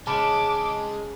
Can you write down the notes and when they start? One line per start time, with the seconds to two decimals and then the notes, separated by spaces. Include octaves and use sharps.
0.07 C#3 G#3 A5 B5 D6